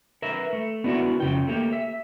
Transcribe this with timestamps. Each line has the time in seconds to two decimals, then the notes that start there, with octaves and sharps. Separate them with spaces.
0.22 A#4 B4 E5
0.53 A3
0.84 B3 D4 E4 F#4 A#4
1.20 F2 C#3 G5
1.47 A3 A#3 G4
1.73 E5